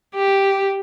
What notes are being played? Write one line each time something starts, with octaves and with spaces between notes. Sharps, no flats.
G4